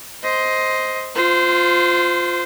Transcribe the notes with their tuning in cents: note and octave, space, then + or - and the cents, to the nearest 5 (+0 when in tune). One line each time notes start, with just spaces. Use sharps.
C5 +0 D#5 +15
F4 +5 C5 -20